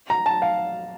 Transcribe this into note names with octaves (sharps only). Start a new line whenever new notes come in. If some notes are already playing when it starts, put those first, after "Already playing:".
A#5
A5
F5